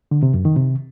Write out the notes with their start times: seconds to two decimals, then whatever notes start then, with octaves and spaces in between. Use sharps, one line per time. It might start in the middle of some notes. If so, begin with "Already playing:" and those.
0.11 D3
0.23 C3
0.34 F#2
0.45 D#3
0.56 C3